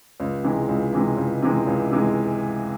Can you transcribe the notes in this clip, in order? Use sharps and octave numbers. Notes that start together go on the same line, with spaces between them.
C#2
C3 E3 G#3
C#2
C3 E3 G#3
C#2
C3 E3 G#3
C#2
C3 E3 G#3